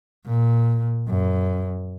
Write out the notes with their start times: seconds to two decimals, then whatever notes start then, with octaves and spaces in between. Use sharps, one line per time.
0.26 A#2
1.08 F#2